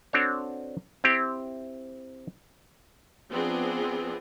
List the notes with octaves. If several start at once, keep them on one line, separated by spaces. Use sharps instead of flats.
C4 D4 F#4 A4 C#5
C4 E4 G4
F3 B3 C4 D4 G#4